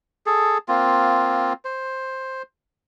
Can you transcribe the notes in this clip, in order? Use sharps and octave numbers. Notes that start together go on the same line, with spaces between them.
G#4 A4
A#3 C4 F4
C5